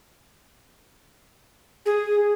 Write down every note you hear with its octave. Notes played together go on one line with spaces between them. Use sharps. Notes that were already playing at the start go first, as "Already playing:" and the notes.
G#4